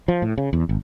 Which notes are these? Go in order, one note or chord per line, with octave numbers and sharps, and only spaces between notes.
F3
A2
C#3
E2
G#1